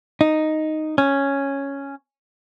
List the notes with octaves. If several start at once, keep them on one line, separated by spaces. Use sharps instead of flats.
D#4
C#4